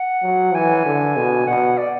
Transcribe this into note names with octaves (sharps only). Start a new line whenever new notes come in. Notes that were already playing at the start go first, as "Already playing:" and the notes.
Already playing: F#5
F#3
E3 G#5
D3
B2
B2 F#5
D5